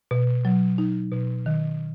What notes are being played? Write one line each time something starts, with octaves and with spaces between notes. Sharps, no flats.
B2
F#3
D#4
B2
D#3